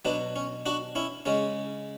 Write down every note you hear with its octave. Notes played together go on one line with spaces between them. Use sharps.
B2 F#3 B3 D4
C#4
D4 F#4
C#4 E4
C#3 G#3 C#4